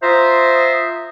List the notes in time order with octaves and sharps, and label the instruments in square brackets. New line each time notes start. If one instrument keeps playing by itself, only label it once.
[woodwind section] F4 C5 E5 A#5 D#6